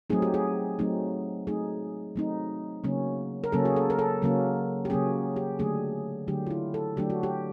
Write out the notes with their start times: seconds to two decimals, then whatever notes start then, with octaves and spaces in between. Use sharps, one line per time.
0.10 F#3 A3 C4 D#4 G#4
0.22 G4
0.34 G#4
0.79 F#3 A3 C4 D#4
1.47 F#3 A3 C4 D#4 G#4
2.16 F#3 A3 C4 D#4
2.84 C#3 F#3 A#3 C#4
3.44 A#4
3.52 C#3 F#3 A#3 C#4 A4
3.65 G#4
3.76 A4
3.90 A#4
3.99 A4
4.22 C#3 F#3 A#3 C#4
4.85 G4
4.90 C#3 F#3 A#3 C#4 G#4
5.36 G4
5.59 D3 F#3 A3 D4 G#4
6.28 D3 F#3 A3 D4 G4
6.47 F4
6.50 E4
6.74 A4
6.97 D3 F#3 A3 D4 G4
7.10 F#4
7.23 G4